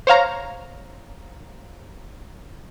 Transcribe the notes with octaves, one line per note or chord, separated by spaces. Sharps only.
C5 C#5 F5 A#5